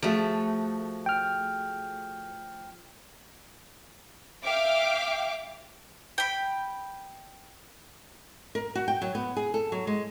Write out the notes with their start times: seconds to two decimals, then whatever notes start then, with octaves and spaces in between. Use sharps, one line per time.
0.02 F3 A3 F#4 G#4
1.06 G5 F6
4.43 E5 F5 G5 D6
6.18 G5 B5
8.55 A#4
8.75 F#4
8.88 G5
9.02 F#3
9.15 B3
9.36 G#4
9.54 A4
9.72 F#3
9.87 G#3